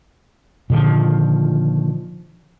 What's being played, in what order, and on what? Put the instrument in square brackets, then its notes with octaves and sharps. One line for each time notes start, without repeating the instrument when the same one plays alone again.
[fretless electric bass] A#2 D3 D#3 F3